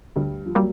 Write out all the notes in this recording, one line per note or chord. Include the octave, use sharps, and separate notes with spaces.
D2 G2 G3
F3
F#3 G3 A#3